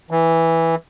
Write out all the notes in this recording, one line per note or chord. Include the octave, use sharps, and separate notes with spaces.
E3